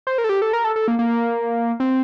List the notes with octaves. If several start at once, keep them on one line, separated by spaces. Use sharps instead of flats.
C5
A#4
A4
G4
A4
A#4
A4
A4
A#3
A#3
C4